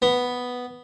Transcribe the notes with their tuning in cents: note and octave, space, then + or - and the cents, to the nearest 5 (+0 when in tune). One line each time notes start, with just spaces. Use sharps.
B3 +0